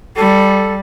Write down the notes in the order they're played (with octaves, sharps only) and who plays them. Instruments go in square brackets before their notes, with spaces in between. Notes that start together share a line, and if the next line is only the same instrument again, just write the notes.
[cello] G3 [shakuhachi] A4